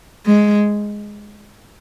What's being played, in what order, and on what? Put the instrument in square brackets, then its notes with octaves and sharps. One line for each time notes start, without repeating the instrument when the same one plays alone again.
[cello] G#3